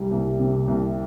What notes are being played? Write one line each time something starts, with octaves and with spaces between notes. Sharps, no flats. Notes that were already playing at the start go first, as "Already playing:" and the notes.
Already playing: C2 G3
C2
C3
C2